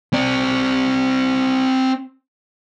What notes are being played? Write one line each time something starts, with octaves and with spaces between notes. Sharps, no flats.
C4 D5